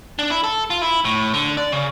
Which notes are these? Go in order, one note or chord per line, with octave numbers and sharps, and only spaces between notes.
D4
E4
A4
F4
E4
A2
D3
D5
C#3